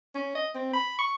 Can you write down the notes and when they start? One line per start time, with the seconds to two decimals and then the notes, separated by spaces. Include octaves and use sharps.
0.15 C#4
0.35 D#5
0.55 C4
0.73 B5
0.99 C#6